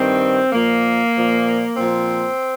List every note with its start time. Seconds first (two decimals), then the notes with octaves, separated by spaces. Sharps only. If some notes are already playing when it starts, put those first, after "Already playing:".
Already playing: G2 D#3 C4
0.52 A#2 F3 A#3
1.15 A#2 F3
1.77 A#2 F3 C4